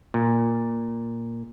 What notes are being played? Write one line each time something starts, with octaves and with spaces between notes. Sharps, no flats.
A#2